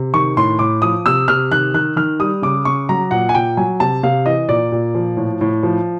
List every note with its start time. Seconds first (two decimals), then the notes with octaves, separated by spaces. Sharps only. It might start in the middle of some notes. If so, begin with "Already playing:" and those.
Already playing: C3
0.14 D#3 C#6
0.37 A2 C6
0.59 A2 D6
0.82 F3 D#6
1.06 C3 E6
1.28 C3 F6
1.51 D#3 F#6
1.74 D#3 F#6
1.96 D#3 F6
2.19 G3 D#6
2.42 C#3 D6
2.65 C#3 C#6
2.89 F#3 A#5
3.11 A#2 F#5
3.29 G#5
3.35 A#2 G5
3.57 F#3 G#5
3.80 C3 A5
4.03 C3 F5
4.26 E3 D#5
4.49 A#2 D5
4.72 A#2
4.95 F3
5.17 A2
5.41 A2
5.63 F3